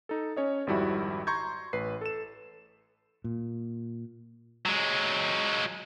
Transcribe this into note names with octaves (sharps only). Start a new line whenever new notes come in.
D#4 A4
C#4 C#5 D#5
G#1 F2 G3 E4 F#4 B5
A#5 C6 C#6 G6 G#6
A1 B4 C7
A4 E7
A#2
F#3 G#3